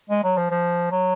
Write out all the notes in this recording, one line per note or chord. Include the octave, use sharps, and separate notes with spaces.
G#3
F#3
F3
F3
F#3